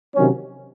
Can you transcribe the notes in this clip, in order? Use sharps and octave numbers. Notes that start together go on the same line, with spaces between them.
C3 D#3 F#3 C#4